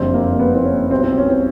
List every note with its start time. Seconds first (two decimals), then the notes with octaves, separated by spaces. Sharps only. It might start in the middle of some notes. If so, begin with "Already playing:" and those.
Already playing: F#1 F2 D3 G3 C4
0.14 A#3
0.39 B3
0.55 C4
0.65 C#4
0.91 B1 B2 G3 C4
1.04 C4
1.17 C#4
1.30 C4